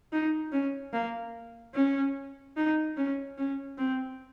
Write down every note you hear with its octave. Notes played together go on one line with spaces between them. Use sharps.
D#4
C#4
A#3
C#4
D#4
C#4
C#4
C4